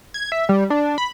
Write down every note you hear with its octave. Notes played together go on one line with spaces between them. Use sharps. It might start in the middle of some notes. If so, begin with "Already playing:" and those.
G#6
E5
G3
D4
B5